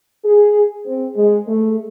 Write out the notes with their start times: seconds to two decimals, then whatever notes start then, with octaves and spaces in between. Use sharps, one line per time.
0.24 G#4
0.85 C4
1.15 G#3
1.47 A3